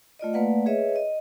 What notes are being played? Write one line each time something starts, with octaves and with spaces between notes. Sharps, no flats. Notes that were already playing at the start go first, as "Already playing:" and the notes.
A3 F4 D5 D#5
A3 A#3 B4 D5 F5 F#5
G#4 B4 C#5 D#5 E5
D#5